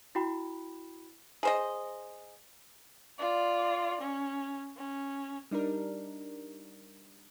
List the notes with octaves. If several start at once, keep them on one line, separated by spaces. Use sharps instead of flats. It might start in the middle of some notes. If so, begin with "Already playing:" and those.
E4 F#4 G5 B5
G#4 C5 D#5
F4 D5
C#4
C#4
G3 D4 D#4 A#4